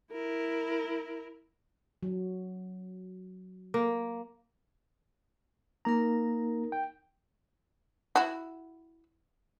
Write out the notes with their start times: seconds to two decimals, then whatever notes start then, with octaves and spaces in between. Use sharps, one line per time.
0.12 E4 A#4
2.03 F#3
3.74 A#3
5.85 A#3 D#4 A#4 A#5
6.72 G5
8.16 E4 F#4